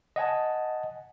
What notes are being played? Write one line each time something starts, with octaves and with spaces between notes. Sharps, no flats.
D#5 F#5 G#5 A5